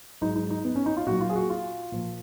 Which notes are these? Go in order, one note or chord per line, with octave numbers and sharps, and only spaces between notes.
G#2 F#3 D#4
D#4
D#4
B3
C#4
D#4
F4
A#2 F#3 F#4
F4
G#4
F#4
F4
A#2 F3